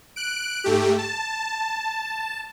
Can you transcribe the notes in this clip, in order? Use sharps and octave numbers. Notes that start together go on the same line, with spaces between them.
F#6 D7
G#2 A3 G4
A5